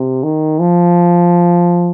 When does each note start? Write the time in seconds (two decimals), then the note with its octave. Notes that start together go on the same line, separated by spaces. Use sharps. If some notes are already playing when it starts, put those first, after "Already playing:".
Already playing: C3
0.23 D#3
0.60 F3